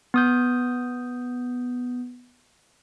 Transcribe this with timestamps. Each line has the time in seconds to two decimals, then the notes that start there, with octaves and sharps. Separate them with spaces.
0.14 B3 D#6 G6